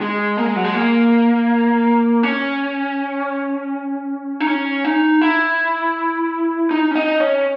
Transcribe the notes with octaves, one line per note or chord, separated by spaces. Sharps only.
G#3
A#3
G#3
F#3
G#3
A#3
C#4
D#4
C#4
D#4
E4
D#4
C#4
D#4
C#4